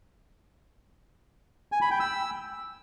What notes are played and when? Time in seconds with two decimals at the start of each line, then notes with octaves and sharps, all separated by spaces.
1.72 G#5
1.81 B5
1.91 G5
2.00 E6